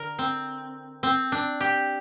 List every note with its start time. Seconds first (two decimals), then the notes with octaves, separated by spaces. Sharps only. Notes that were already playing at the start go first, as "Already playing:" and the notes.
Already playing: D3 A#4
0.19 C4
1.03 C4
1.32 D4
1.60 G4